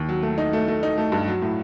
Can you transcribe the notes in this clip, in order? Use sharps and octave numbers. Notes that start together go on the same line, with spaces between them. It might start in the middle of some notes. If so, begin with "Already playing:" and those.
Already playing: D#2
F#3
A3
D#4
A3
A3
D#4
A3
G2
F#3
A2